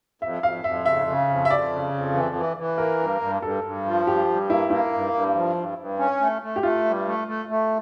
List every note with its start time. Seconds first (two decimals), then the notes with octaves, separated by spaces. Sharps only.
0.22 F2 E5
0.43 F2 F5
0.64 F2 E5
0.86 C#3 E5
1.07 C#3
1.29 F2
1.45 E5
1.50 F2 D5
1.72 C#3
1.93 F2
2.14 E3
2.35 E3
2.57 E3
2.78 A#3 A#4
2.99 G2
3.21 G2
3.42 G2 A4
3.64 G2
3.85 F3
4.07 G2 G4
4.28 G2
4.49 A#3 E4
4.70 A#3 E4
4.93 G2
5.13 G2
5.35 F3
5.57 G2
5.78 G2
5.99 C#4
6.20 A3
6.42 A3
6.56 G4
6.63 A3 F4
6.85 G2
7.07 A3
7.28 A3
7.49 A3